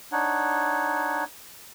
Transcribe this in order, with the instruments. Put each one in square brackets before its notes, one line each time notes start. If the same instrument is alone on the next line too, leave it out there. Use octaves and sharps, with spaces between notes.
[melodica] D4 D#4 C#5 F#5